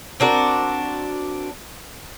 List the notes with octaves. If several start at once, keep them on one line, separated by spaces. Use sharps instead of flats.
C4 D4 F#4 A#4